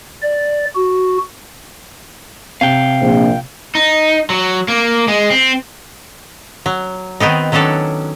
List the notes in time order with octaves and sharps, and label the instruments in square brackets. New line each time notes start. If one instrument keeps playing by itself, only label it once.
[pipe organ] D5
F#4
[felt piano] C3 [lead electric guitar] F5 G5
[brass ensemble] A#1
[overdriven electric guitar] D#4
F#3
A#3
G#3
C4
[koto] F#3
D#3 B3 C4 D#4
D#3 F#3 C#4 D4 A4